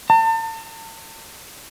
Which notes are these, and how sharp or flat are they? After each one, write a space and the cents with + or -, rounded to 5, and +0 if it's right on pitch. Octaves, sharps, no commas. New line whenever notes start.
A5 +40